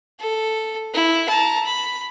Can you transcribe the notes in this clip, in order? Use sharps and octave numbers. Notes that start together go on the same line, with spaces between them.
A4
E4
A5 A#5
B5